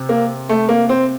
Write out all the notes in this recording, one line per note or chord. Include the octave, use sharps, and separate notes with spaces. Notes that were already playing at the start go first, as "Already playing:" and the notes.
Already playing: C3 C4
A#3
A3
A#3
C4